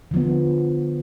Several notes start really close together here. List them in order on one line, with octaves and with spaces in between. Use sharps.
D3 F3 B3